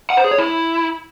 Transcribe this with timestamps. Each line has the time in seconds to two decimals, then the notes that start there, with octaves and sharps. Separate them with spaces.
0.10 F#5
0.17 C5
0.24 G#4
0.31 C#5
0.38 E4